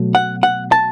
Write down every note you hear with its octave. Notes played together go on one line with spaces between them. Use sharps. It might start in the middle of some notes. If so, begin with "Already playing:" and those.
Already playing: B2 F#3 A3
F#5
F#5
A5